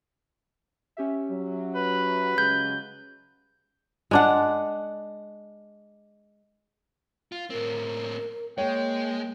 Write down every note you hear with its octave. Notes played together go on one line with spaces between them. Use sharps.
C#4 G4 E5
F#3
B4
C#3 F#3 G#3 G6
G#3 D4 F#5
F4
A2 C4 A#4
G#3 A#3 C#5 G5